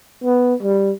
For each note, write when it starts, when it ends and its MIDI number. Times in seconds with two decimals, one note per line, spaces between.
0.24 0.54 59
0.62 0.91 55